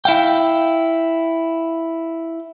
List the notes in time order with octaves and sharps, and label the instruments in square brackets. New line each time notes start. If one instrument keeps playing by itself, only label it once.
[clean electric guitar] E4 F5 G5